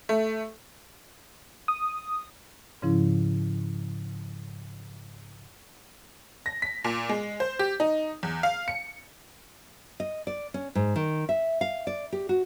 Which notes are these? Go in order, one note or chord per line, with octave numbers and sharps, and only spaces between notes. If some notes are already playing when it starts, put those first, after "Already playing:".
A3
D#6
G#2 C#3 F3 C#4 E4
A#6
B6
A#2
G#3
C5
G4
D#4
E2
F5
C#7
D#5
D5
C#4
G#2
D#3
E5
F5
D5
G4
F#4